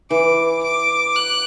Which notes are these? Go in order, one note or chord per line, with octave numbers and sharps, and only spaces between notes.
E3 D6
D6
F#6